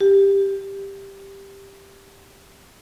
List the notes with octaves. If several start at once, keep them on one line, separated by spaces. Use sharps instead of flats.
G4